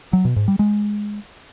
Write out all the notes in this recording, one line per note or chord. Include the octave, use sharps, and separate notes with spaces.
F#3
B2
G#2
G3
G#3